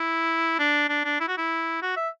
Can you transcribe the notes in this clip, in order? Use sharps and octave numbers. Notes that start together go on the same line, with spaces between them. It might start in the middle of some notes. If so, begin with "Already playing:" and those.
Already playing: E4
D4
D4
D4
E4
F#4
E4
F#4
E5